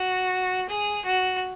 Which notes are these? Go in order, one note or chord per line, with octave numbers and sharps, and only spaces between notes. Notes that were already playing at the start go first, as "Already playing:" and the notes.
Already playing: F#4
G#4
F#4